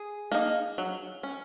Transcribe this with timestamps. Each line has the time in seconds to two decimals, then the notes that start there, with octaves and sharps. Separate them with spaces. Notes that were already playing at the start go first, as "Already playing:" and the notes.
Already playing: G#4
0.32 A#3 D#4
0.78 F#3
1.23 C#4